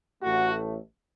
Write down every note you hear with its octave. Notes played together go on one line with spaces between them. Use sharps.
A1 A2 A3 F#4